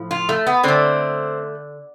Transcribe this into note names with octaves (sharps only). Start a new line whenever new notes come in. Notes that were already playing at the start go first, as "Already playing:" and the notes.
Already playing: A2 F3
F4
A3
B3
D3 A3 C4